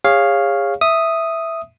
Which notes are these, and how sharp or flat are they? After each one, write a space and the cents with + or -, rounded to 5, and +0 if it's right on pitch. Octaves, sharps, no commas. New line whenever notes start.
G#4 -35 C#5 +0 F5 +0
E5 +0 D#6 +0